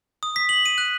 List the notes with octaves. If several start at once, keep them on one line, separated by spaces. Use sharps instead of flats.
D#6
B6
F#7
D#7
F#6